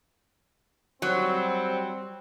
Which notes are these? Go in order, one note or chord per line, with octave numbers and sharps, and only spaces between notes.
F#3 G3 C4